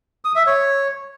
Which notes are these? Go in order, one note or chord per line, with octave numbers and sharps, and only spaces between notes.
D#6
E5
C#5